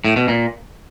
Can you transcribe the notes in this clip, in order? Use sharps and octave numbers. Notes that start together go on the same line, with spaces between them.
A2
B2
A#2